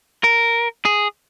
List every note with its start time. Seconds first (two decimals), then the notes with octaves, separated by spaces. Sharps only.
0.24 A#4
0.85 G#4